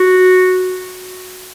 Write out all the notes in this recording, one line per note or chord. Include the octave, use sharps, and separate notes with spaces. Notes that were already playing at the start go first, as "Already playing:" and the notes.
Already playing: F#4